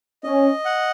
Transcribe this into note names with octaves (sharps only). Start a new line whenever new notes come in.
C#4 D#5
F#5